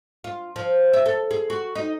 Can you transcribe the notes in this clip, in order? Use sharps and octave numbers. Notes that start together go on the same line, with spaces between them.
F4
F3
E5
A4
G#4
F#4
D#4